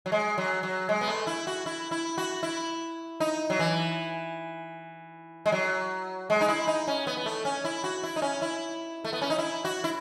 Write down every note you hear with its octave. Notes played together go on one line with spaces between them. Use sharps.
F#3
G#3
F#3
F#3
G#3
B3
A3
E4
F#4
E4
E4
F#4
E4
D#4
F#3
E3
G#3
F#3
G#3
D#4
E4
D#4
C#4
B3
B3
A3
C#4
E4
F#4
E4
D#4
C#4
E4
A3
B3
C#4
D#4
E4
F#4
E4